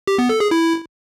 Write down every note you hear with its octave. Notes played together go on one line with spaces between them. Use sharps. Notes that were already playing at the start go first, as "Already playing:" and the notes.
G4
B3
A4
G#4
E4